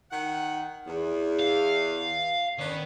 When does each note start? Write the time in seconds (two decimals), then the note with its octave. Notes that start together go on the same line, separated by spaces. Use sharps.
0.11 D#3 F#5
0.87 E2
1.39 F5
2.58 D#3 B3 C#4 D4